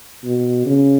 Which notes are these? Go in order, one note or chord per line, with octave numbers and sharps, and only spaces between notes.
B2
C#3